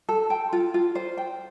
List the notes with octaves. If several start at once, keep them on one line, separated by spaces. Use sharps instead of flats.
A4
G5
F4
F4
C5
G5